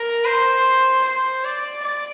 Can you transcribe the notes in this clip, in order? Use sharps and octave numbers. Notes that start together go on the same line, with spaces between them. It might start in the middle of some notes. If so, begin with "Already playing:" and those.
Already playing: A#4
C5
C5
D5
D5